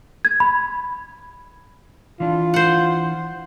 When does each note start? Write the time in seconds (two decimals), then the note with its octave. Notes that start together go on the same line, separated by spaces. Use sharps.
0.25 G#6
0.40 B5
2.20 E3 D4 F4
2.54 C5 F#5